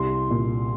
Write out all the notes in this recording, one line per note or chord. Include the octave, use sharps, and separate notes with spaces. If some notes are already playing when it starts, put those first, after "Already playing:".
Already playing: C2 C6
A#2